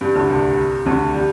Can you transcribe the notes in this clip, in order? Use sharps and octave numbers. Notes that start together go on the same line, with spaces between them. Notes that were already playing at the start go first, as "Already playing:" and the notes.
G2 G3
D2 D3
C2 C3
D2 D3
G3